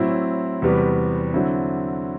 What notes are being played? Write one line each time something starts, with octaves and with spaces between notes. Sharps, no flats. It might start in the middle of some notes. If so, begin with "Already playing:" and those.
Already playing: A2 F#3 C4 E4
E2 C3 G3 B3 F#4
D3 F#3 C4 E4